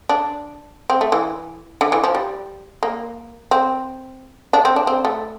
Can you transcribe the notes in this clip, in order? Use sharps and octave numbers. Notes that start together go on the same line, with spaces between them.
D4
C4
A3
E3
D3
E3
F3
G3
A#3
C4
D4
C4
D4
C4
A3